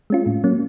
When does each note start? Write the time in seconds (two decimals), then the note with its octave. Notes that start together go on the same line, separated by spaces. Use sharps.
0.10 G#3 C#4 F4
0.26 A2
0.44 F#3 A#3 C#4